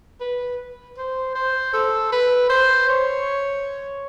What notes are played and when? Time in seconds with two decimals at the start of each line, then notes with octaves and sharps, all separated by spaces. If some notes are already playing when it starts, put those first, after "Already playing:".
0.20 B4
0.98 C5
1.35 C5
1.73 A4
2.12 B4
2.50 C5
2.89 C#5